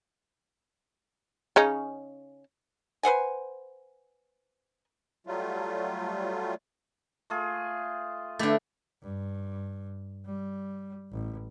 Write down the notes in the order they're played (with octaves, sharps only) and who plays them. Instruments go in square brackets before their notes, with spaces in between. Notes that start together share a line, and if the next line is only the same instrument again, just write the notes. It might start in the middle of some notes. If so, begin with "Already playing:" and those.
[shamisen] C#3 C#4 D#4
[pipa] B4 C5 F#5 G#5
[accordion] F#3 G3 A3 F4
[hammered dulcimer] A3 F4 G#4
[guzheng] D3 A3 [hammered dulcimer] E4 G4
[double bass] G2
G3
A1